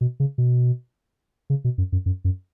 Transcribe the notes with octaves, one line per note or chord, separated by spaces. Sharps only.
B2
C#3
B2
C#3
B2
F#2
F#2
F#2
F#2